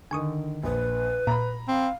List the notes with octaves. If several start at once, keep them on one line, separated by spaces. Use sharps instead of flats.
D3 D#3 G#5 C#6 D#6
A#1 B4
A#2 A#5 B5
C4 F5